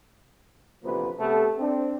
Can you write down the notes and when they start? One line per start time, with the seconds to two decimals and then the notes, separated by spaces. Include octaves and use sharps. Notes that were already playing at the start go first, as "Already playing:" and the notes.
0.84 A1 D2 C3 F3 A#3 B4
1.19 C3 A3 B3 G4 A4
1.58 C4 D4